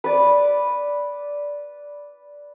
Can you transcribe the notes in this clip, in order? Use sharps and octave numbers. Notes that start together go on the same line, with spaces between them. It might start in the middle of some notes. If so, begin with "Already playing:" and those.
B4 D5